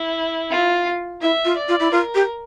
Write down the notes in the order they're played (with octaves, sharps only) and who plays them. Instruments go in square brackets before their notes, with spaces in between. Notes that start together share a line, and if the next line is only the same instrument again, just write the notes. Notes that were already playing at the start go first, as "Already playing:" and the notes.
Already playing: [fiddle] E4
F4
[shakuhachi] E4 [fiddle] E5
[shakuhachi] F4
[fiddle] D5
[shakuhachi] F4
E4
[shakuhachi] F4 [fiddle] A#4
[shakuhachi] G4